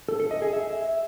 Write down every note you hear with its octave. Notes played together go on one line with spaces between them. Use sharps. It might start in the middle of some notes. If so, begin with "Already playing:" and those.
A4
A4
D#5
G#4
E5